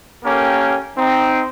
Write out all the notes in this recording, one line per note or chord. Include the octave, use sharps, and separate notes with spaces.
A#3 C#4 G4 A4 A#4 G5
C4 D#4